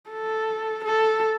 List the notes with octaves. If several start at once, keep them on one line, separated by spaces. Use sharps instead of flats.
A4
A4